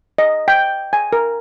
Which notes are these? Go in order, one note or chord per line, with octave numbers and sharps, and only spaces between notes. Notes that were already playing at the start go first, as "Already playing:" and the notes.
D#5
G5
G#5
A#4